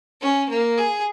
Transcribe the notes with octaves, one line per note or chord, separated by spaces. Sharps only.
C#4
A#3
G#4